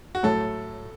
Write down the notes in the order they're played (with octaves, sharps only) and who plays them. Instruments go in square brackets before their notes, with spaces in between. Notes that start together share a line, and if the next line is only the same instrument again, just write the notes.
[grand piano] F#4
[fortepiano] A2 F#3 A3 [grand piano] A4